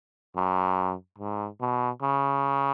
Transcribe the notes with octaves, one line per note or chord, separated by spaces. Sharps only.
F#2
G#2
B2
C#3